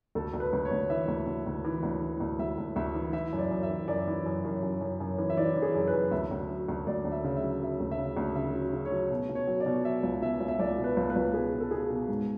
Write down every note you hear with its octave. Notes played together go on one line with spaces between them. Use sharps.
D2 A4
D2
B4
D2
C#5
D2
E3 E5
D2
D2
D2
E3
D2
E3
D2
D2 E5
D2
D2 E5
E3
E3 E5
F#2
D5
F#2
E5
E3
F#2 D5
E3
F#2
F#2
F#2
F#2
F#2
E3
E5
E3 D5
E3
G#4
F#2
B4
F#2
D2 E5
D2
F#3
D2
D2 D5
D2
E5
C#3
E5
F#3
F#3 E5
D2
E5
C#3
D2
C#3 E5
F#3
C#3
C#5
F#3
B2
B2
C#5
F#3
D5
B2
F#3 E5
C#2
B2 E5
C#2
E5
C#2 D5
B2
B4
C#2
B4
C#2
B2 G#4
B2
A4
B2 G#4
B2
G#2